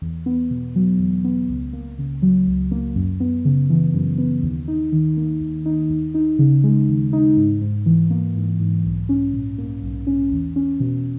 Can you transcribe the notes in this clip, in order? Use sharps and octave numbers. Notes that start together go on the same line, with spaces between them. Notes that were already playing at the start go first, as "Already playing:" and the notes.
E2
B3
B2
F#3
E2
B3
C#2
A#3
C#3
F#3
C#2
A#3
F#2
B3
C#3
E3
F#2
B3
D#2
D#4
D#3
A#3
D#2
D#4
D#2
D#4
C#3
G#3
D#2
D#4
G#2
G#2
E3
A#3
G#2
G#2
B1
C#4
A#2
A#3
B1
C#4
E2
C#4
B2